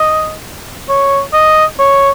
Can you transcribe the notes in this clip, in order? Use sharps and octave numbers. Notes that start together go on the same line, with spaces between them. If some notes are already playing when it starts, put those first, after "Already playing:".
Already playing: D#5
C#5
D#5
C#5